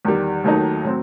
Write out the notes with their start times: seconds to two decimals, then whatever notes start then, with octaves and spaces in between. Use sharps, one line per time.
0.05 E2 D#3 G3
0.44 D#2 D#3 F#3 A3 D#4
0.84 A2 F#3 C4